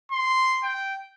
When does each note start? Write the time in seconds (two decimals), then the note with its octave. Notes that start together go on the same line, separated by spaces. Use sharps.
0.12 C6
0.64 G5